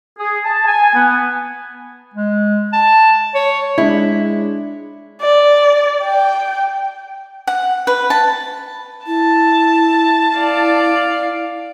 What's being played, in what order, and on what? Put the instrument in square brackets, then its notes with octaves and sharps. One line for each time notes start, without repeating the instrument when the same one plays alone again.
[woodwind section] G#4
A5
G#5
B3
[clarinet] G#3
A5
C#5
[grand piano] G#3 D4 [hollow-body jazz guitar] E4
[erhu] D5
G5
[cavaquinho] F#5
B4
A5
[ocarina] E4 [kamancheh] A5
[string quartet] D5 F5